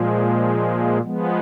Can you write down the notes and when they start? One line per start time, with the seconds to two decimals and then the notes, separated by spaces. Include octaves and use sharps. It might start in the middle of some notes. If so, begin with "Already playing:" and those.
Already playing: A#2 F3 G#3
1.01 F3 G#3 B3